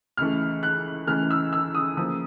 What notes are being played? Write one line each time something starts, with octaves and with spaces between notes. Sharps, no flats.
C#2 C#3 E3 A3 F6
F#6
C#2 C#3 E3 A3 F6
E6
E6
D#6
C#3 F3 A#3 D#6